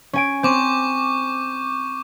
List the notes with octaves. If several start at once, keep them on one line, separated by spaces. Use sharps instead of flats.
C#4 G#5 D7
C4 C#6 D6 G6